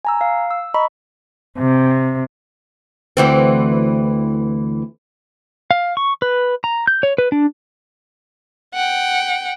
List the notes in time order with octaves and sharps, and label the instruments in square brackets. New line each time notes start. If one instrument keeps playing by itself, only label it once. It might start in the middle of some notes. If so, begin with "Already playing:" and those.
[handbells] G#5 A#5 E6
F5
E6
D#5 A#5 B5 C#6
[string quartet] C3
[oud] D2 E3 C4
[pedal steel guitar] F5
C#6
B4
A#5
G6
C#5
B4
D4
[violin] F#5 G5